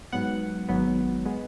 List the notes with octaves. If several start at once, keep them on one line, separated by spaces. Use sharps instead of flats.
G#2 F#3 B3 F#5
G#1 G#2 F#3 B3
G#3 B3